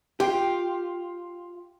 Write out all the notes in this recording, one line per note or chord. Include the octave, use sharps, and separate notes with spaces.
F4 G4 G5 C7